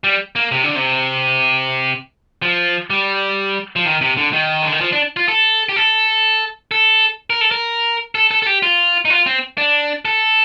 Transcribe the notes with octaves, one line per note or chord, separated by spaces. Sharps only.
G3
A#3
C3
D3
C3
F3
G3
F3
D#3
C3
D3
D#3
D3
D#3
F3
D4
F4
A4
G4
A4
A4
A#4
A4
A#4
A4
A4
A4
G4
F4
D#4
F4
C4
D4
A4